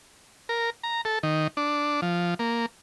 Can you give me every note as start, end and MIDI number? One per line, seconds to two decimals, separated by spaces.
0.49 0.70 70
0.83 1.01 82
1.05 1.19 69
1.23 1.47 51
1.57 2.01 62
2.02 2.34 53
2.39 2.66 58